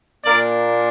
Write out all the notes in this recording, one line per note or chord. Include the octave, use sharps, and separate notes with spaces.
A#2 A#3 D4 A#4 D5